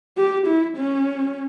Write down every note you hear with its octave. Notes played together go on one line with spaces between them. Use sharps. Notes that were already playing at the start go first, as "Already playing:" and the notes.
G4
E4
C#4